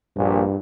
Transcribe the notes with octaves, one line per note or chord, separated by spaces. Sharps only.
A#1 G2 A#2